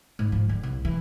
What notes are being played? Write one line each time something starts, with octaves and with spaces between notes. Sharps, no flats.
G#2
F3
D3
C2
E3